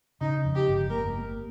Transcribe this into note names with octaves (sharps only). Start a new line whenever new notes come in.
C#3 D#4
F2
G4
G1
A#3 A#4
A#3